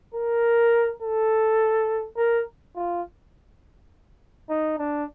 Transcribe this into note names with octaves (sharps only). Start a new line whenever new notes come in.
A#4
A4
A#4
F4
D#4
D4